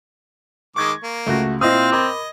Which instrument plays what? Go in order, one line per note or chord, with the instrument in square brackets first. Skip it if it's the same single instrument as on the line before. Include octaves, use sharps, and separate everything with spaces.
[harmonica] D#3 G#3 D6 [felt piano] C#6 G#6 A#6
[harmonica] A#3
[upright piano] C#2 [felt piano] A3 F#4
[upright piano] A#2 E4 [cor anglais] C4 [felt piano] C5 D#5 D#6 [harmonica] F5
[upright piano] A#4 B5 G#6 [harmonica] D#5 [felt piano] D6